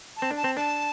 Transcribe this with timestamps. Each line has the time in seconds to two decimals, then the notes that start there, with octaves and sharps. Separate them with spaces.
0.17 A5
0.22 C4
0.31 D4
0.37 A5
0.44 C4
0.57 D4 A5